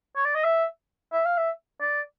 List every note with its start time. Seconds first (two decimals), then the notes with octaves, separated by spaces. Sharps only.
0.16 C#5
0.25 D5
0.35 D#5
0.44 E5
1.12 E5
1.25 F5
1.37 E5
1.81 D5